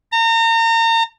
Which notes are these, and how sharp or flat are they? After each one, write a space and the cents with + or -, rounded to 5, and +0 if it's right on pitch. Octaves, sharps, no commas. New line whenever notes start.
A#5 -35